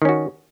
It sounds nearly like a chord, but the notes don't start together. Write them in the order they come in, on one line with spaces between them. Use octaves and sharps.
D#3 C#4 F#4